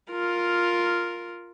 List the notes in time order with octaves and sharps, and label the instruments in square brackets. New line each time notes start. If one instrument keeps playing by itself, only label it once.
[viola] F4 A#4